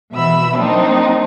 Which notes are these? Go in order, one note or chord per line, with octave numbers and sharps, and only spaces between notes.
B2 E3 E5 B5 E6
F#3 A#3 C4 D4 D#4